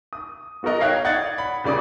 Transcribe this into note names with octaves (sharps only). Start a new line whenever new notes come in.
D#6
B3 F#4 A4 A#4 D#5
C#5 D#5 F5 G5 F#6 G#6
D5 F#5 D#6 G#6 A6
B5
D#1 C#3 D5 D6 D#6